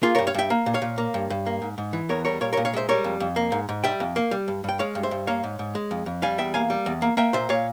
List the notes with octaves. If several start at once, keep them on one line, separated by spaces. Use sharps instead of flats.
A#3 F4 G#4
G2 A#4 C#5
C#5 F5
G2 E5 G5
A#3
A#2
C#5 F5
A#2
A#3
G2
G2
A#3
G#2
G#2
E3
E2 A#4 C#5
G3 A#4 C#5
A#2 A#4 C#5
A#2 A#4 C#5
C#5 F5
G#3 C5 E5
G3 A#4 C#5
F2
F2
A#3
G#2
G#2
G3 E5 G5
F2
A#3
G3
G2
G2 G5
G#3 C#5 F5
G2
C5 E5
G2
A#3 C#5 F5
G#2
G#2
G#3
F2
F2
G3 F5 G#5
E2 E5 G5
A#3 F5 G#5
G3
E2
A#3
A#3 E5 G5
A#2 C5 E5
A#2 C#5 F5